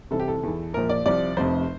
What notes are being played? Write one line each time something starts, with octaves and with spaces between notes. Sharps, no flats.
C2 C3 E3 A4
G4
A4
E2 E3
A#1 A#2 F3 A#4
D5
C2 C3 F3 D5
F1 F2 C3 F3 C5